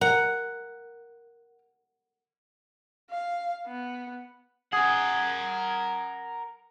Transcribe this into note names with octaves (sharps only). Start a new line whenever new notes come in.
A#4 F#5
F5
B3
G#4 A#4 F#5